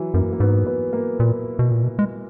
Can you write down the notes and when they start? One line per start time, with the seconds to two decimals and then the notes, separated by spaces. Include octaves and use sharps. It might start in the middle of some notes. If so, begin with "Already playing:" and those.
Already playing: E3 F#3
0.14 F#2 A#3
0.33 A#3
0.40 G#2 B3
0.66 B3
0.93 A#3
1.20 A#2
1.59 B2
1.71 A#2
1.83 B2
1.99 G#3